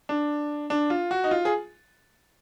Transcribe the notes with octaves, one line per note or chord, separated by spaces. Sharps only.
D4
D4
F4
F#4
D#4
F4
G#4